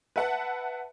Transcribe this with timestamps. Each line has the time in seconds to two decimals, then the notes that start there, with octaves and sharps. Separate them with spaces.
0.16 B4 E5 F#5 A5